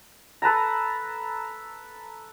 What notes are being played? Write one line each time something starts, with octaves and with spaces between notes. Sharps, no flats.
A4 B4 A5 A#5